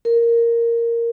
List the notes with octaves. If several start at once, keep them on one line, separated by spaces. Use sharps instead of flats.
A#4